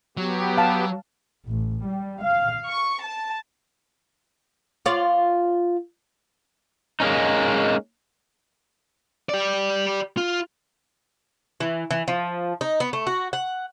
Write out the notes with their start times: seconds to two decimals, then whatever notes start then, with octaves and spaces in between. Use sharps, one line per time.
0.17 F#3 B3 G4
0.57 F5 A5
1.48 A1
1.86 G3
2.24 F5
2.68 C#6
3.02 A5
4.86 F4 C#5 D5
7.00 G#3 A#3 B3 C#4 D#4
9.29 G4 D5
10.17 F4
11.60 E3
11.91 E3
12.08 F3
12.61 D#4
12.80 B3
12.93 A3
13.07 F#4
13.33 F#5